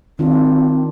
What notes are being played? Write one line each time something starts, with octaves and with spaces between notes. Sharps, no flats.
D#3 C4 D4 F4